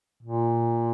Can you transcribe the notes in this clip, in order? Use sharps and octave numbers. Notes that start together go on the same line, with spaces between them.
A#2